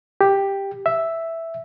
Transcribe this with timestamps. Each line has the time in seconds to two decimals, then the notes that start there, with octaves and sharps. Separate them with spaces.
0.21 G4
0.86 E5